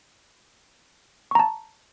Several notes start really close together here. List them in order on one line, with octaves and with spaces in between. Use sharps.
C#6 A#5 A5